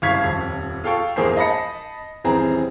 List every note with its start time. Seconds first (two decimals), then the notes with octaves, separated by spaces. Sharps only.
0.02 F#1 C2 F5 C#6 G#6 B6
0.23 D#1 F2
0.84 F4 A4 F5 G5 C#6
1.16 A#1 E2 A#3 G#4 C5 C7
1.37 D#5 A5 B5 A#6 C#7
2.24 D#1 E3 C4 G#4 A#5